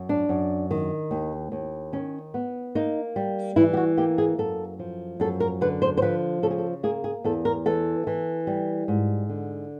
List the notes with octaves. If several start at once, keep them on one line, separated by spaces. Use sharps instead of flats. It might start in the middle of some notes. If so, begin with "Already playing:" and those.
Already playing: F#2
D4
F#2
D#3
D#2
D#2
D#3 C#4
B3
A#3 D#4
G3
E3 E4
G4
F#4
A#3 G4
G#4
F#2 A4
F3
F#2 A4
A#4
D3 B4
C5
C5
F3 B4
C#3 A4
G#4
A4
A#3 G#4
G#4
E2 A4
A#4
E3 A4
E3
G3
G#2
D3